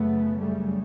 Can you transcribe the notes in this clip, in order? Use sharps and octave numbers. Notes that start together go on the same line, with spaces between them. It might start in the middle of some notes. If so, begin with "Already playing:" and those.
Already playing: F#2 C#3 A3 B3
G3 A3